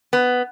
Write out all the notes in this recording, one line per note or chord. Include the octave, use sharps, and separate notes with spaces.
B3